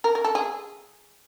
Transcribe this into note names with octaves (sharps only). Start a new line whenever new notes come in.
A#4
A#4
A4
G#4